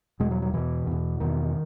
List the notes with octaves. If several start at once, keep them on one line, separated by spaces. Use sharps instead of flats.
E2 B2 G#3
F#3
F#3
E2 B2 E3
E2 B2
E2 B2 D#3